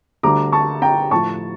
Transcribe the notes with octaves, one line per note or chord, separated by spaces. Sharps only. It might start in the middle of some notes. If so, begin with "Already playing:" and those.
D2 D3 G3 A#5 D6
A5 C#6
G5 A#5
A2 F3 A5 C#6